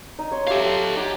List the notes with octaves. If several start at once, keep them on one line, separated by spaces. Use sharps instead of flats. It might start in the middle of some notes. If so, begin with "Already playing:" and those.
D#4
C#5 C6
G4 A4 E5 F5
D#4 G4 F#5 G#5